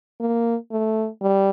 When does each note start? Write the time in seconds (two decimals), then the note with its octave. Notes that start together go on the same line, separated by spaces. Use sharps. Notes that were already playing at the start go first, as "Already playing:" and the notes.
0.20 A#3
0.72 A3
1.22 G3